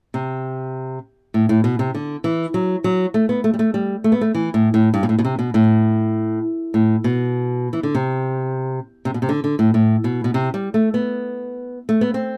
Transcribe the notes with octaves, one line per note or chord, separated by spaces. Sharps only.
C3
A2
A2
B2
C3
D3
E3
F#3
F#3
A3
B3
A3
G3
A3
G3
A3
B3
A3
E3
A2
A2
G2
B2
A2
B2
C3
B2
A2
A2
B2
E3
D3
C3
C3
B2
C3
D3
D3
A2
A2
B2
B2
C3
G3
A3
B3
A3
B3
C4